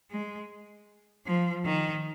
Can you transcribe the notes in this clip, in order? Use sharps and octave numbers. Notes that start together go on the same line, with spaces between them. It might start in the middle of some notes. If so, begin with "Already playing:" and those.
G#3
F3
D#3